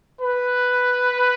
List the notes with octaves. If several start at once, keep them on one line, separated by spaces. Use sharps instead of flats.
B4